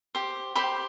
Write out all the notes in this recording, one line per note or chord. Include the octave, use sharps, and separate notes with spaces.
G4 C5
G4 C5 G5 B5